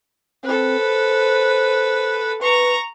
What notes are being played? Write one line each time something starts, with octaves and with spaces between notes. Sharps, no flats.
C4 A4 B4
C5
B4 A#5 C#6